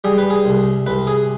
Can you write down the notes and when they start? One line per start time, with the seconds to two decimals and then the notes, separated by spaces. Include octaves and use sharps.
0.04 G3 G#4
0.18 B4
0.30 G#4
0.45 C2
0.86 C2 B4
1.07 G#4